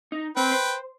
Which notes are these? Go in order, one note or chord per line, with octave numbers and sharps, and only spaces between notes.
D#4
C4 B4 C5 G5
C5